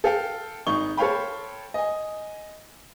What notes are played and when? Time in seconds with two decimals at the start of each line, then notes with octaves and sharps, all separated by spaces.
0.04 A4 F5 G5
0.67 G#1 D#4 C#6 G7
0.97 A4 C5 C#5 F5 G5 B5
1.74 D#5 G#5